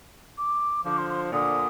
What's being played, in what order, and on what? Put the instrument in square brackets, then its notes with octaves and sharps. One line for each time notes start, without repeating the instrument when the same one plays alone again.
[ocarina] D6
[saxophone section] D3 F3 [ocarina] D6
[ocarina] C6
C6
[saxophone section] A#2 D3 [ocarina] D#6